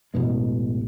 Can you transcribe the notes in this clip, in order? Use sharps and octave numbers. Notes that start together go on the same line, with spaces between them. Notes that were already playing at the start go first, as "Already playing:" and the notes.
A1 F#2 B2 G#3